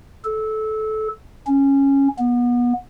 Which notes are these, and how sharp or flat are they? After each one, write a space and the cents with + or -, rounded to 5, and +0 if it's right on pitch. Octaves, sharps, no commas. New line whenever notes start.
A4 -20
C#4 -10
B3 -30